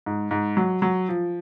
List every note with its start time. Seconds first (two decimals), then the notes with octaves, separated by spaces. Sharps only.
0.06 G#2
0.31 G#2
0.57 F#3
0.82 F#3
1.09 F3